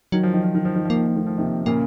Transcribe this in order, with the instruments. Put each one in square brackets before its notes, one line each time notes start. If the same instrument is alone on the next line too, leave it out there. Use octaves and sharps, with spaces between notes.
[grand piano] D#3 [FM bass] F#3
[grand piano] F3
D#3
F3
D#3
F3
D#3
[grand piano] F3 [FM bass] A#3
[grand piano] D#3
F3
[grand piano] D#3 [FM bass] A3
[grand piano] F3
[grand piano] C3 D#3 [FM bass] A#3
[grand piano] A#2 C#3 [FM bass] A#3